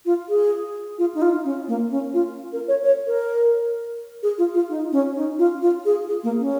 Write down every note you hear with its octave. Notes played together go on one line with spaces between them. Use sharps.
F4
G#4
F4
D#4
F4
C#4
A#3
C#4
F4
A#4
C#5
C#5
A#4
G#4
F4
F4
D#4
C#4
D#4
F4
F4
G#4
G#4
A#3
C#4